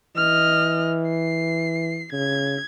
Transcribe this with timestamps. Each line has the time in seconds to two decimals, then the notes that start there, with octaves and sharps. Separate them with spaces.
0.16 E3 D#5 F6
1.10 C7
2.12 C#3 G#6